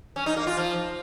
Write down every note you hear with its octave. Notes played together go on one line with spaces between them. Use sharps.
C#4
D#4
A#3
F4
F3